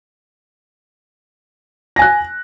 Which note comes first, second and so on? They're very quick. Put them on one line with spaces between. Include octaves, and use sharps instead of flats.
A#6 G#5 F#6